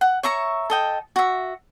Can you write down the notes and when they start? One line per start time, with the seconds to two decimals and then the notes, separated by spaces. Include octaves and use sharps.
0.01 F#5
0.23 C#5 E5 A#5 C#6
0.70 A4 D#5 G5
1.16 F#4 E5